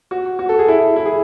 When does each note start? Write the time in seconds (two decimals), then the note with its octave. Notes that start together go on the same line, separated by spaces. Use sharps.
0.11 F#4
0.39 F#4
0.49 A4
0.59 G#4
0.68 E4
0.96 E4
1.05 G#4